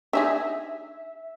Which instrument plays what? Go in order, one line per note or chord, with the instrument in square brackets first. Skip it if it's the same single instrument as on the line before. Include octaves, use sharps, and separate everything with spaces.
[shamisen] D4 D#4 G#4 [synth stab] E5